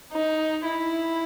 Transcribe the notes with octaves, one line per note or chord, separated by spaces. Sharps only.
D#4
E4